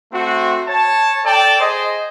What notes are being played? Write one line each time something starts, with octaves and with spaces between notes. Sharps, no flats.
A3 C4 F#4
C#5 A5
A4 D5 G5 A5
G#4 C5 D#5